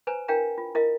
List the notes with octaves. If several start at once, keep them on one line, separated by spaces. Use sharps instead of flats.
B4 C5 G#5 A#5
D4 E4 A#4 F5 G5 A#5
F4
E4 A#4 D#5 F5